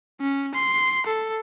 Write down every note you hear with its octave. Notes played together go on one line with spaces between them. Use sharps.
C#4
C6
A4